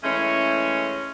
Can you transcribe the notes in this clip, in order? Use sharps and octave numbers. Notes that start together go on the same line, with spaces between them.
E3 G#3 A3 C#4